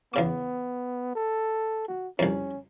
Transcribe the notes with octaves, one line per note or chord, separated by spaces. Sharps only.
E2 C#3 B3 D6
A4
F#4
C2 F2 C#4